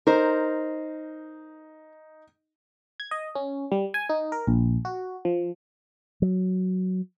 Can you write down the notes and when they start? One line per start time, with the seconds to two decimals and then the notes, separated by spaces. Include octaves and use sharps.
0.07 D#4 A#4 C5
3.00 G#6
3.11 D#5
3.35 C#4
3.72 G3
3.94 G#5
4.09 D#4
4.32 A#4
4.47 A#1
4.85 F#4
5.25 F3
6.22 F#3